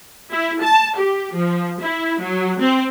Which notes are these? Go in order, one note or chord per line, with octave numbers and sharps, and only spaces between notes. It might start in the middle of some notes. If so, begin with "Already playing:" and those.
E4
A5
G4
F3
E4
F#3
C4